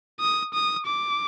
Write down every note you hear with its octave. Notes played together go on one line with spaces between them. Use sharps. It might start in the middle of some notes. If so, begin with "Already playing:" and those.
D#6
D#6
D6